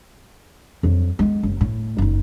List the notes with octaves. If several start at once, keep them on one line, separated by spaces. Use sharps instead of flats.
F2 F#3
G#3 B3
F#1
A2
F#1 D#4